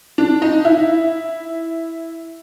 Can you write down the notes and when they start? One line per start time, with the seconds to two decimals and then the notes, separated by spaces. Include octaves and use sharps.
0.18 D4
0.42 D#4
0.65 E4